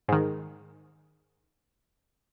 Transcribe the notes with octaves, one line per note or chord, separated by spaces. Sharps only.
G#2 D#3